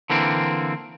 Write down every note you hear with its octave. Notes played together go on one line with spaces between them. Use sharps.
D3 E3 A#3 C4